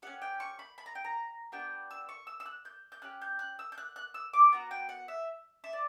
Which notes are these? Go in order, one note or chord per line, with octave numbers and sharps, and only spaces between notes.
C#4 G4 F#5
G5
C#6
B5
B5
A#5
G5
A#5
B3 D4 G4 G5
E6
C#6
E6
E6
F#6
G6
G6
C#4 G4 F#6
G6
F#6
E6
G6
F#6
F#6
E6
D6
B3 F#4 A#5
G5
F#5
E5
E5
D5